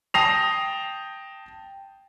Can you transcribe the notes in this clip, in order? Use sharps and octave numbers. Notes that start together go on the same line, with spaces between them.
G5 A5 D#6 A#6 C7 F7